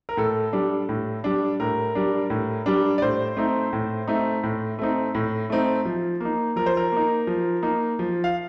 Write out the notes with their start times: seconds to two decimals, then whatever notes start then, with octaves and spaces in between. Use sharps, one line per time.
0.09 A#4
0.17 A2 A4
0.53 G3 D4
0.89 A2
1.24 G3 D4
1.60 A2 A#4
1.95 G3 D4
2.30 A2
2.66 G3 D4
2.98 D5
3.02 A2 C5
3.37 A3 C4 D#4
3.73 A2
4.08 A3 C4 D#4
4.43 A2
4.79 A3 C4 D#4
5.15 A2
5.50 A3 C4 D#4
5.85 F3
6.20 A#3 D#4
6.56 F3 A#4
6.66 C5
6.77 A#4
6.92 A#3 D#4
7.27 F3
7.63 A#3 D#4
7.99 F3
8.24 F5